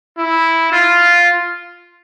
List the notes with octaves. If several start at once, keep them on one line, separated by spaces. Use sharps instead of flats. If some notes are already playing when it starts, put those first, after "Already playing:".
E4
F4